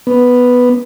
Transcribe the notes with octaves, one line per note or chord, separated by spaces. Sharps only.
B3